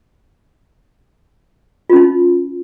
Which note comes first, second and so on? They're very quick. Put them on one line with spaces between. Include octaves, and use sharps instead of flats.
F4 C#4 D#4